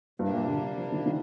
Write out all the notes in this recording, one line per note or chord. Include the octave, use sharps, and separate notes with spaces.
G2 C3 G3 A#3 D4
A#2
D3
F3
D#3
D#3